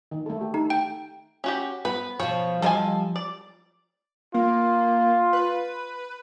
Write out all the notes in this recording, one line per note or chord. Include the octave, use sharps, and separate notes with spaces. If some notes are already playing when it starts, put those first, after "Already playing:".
D#3
A3 A4
G4
D#4 A4
G5
C#4 F#4 G4
B3 B4
B2 F3 C#5
F3 G3 A4 A#4 D#5 G#5
D5
A#3 F4
B4